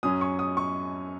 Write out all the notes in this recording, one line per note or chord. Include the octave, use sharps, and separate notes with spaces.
F#2 F#3 C#4 D#6
C#6
D#6
C#6